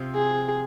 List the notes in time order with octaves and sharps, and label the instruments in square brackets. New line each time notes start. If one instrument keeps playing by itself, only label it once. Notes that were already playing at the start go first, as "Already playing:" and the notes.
Already playing: [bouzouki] C3 F3 C4
[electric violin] G#4